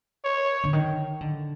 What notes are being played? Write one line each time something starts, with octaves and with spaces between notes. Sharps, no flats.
C#5
D3
D#3
D3